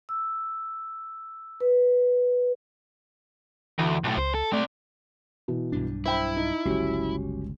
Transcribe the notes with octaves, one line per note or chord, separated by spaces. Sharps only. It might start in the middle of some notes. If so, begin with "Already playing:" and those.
E6
B4
D2 E3
B1 A2
C#2 C5
A4
A3 C4 D5
B2 E3
B1 G2 D4
E4 C5 G5 B5
D#4
G1 C#2 F#3 C#4 G4